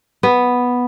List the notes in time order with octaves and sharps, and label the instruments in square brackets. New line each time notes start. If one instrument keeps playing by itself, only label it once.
[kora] B3